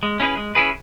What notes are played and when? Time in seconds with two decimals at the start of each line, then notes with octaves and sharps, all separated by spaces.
0.03 G#3
0.20 C#4 E4 G#4 B4
0.37 G#3
0.55 C#4 E4 G#4 B4